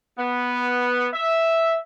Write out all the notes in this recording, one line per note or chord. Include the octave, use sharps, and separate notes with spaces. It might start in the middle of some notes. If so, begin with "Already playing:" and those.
B3
E5